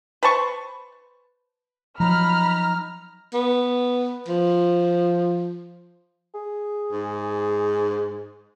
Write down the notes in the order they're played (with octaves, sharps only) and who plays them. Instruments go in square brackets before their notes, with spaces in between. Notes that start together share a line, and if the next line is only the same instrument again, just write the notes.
[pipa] B4 C5 A5 C#6
[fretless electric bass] F3 F#3 [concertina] D#4 A#5 [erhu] B5 [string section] F6
[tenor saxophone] B3
F3
[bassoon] G#4
[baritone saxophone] G#2